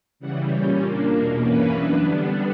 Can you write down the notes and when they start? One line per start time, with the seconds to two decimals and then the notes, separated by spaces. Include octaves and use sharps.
0.20 C#3 E3 G3 F#5
0.50 A#2 G3 C#4 G5
0.81 A#2 A#3 D4
1.11 E2 B2 A#3 A#4
1.41 G2 E3 A#3 C#4 B4
1.72 F#2 E3 B3 D4
2.02 D3 G3 B3 D4